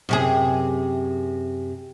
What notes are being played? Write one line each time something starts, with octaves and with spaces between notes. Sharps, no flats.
F#2 C3 G#4